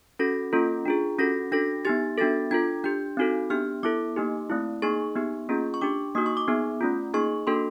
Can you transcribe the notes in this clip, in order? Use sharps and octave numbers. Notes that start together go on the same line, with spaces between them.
C#4 F#4 A4 A#6
A#3 C#4 F4 A4
D4 F4 G#4
C#4 F#4 A4 A#6
D4 F#4 A4 A#6
B3 D#4 G4 A6
B3 D4 F#4 A4 A6
D4 F4 A4 G#6
D4 G4 G6
C4 D#4 F#4 A4
B3 D4 G4 F6
B3 E4 A4 D6
A#3 D#4 G4
A3 C4 E4
A#3 D#4 G#4 C#6
B3 D#4 G4
A#3 C#4 F4 G#4
C#6
D4 G4 D6
A#3 D#4 F#4 D#6
C#6
D6
B3 D#4 G#4
A3 C#4 F4
A#3 D#4 G#4 C#6
A#3 D4 F#4 A4 C6